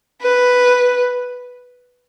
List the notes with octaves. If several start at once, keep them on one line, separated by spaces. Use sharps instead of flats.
B4